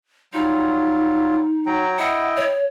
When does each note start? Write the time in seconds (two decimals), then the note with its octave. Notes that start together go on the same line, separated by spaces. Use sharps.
0.33 F#3 G3 D#4 F4
1.66 F#3 G5 A#5
1.99 E4 D#5 F#5 G5
2.36 C#5